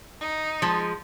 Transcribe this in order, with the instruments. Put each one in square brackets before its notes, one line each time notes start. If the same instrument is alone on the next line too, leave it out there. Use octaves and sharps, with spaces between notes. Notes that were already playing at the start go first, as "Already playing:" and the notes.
[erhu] D#4
[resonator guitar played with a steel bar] F3 G#3